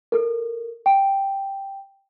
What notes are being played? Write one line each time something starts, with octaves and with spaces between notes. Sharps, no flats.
A4 A#4
G5